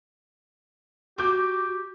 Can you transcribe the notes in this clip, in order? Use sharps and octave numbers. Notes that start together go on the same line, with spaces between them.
F#4 G4 D6 G6